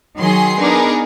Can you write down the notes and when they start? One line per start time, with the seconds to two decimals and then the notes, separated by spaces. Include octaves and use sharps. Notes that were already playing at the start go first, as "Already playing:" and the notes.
0.17 D#3 F#3 G#4 C6 C7
0.60 B3 D4 D#4 G#4 A#4